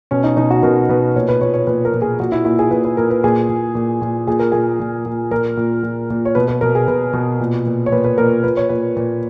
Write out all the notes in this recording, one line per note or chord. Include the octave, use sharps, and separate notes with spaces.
B2 C#4
D#4
B2 D#4
F#4
B2 A#4
B2 B4
A#2 C#5
B4
A#2 C#5
C#5
A#2 B4
A#4
A#2
G#4
A#2 F#4
E4
A#2 E4
G#4
A#2 B4
B4
A#2 A#4
B4
A#2 G#4
A#2
A#2
A#2
A#2 G#4
A#4
A#2 G#4
A#2
A#2
A#2 A#4
A#2
A#2
A#2
C#5
B2 B4
B4
B2 A#4
G#4
B2 B4
B2
A#2
A#2
C#5
A#2 B4
B4
A#2 A#4
A#2 B4
C#5
A#2 B4
A#2